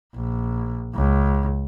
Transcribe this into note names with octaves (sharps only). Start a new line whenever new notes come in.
A#1
C#2